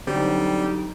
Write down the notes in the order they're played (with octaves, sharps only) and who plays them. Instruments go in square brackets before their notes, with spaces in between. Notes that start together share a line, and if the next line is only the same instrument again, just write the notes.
[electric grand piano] D3 F#3 [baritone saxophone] G3 [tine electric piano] C4 [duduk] D#4